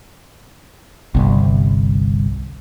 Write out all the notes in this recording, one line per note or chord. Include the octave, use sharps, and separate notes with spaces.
G1 C2